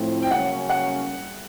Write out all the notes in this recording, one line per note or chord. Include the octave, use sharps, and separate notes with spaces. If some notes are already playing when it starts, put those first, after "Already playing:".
Already playing: A2 F3 A3 C4 E4
G5
C#3 F#3 A#3 C#4 F#5
F#5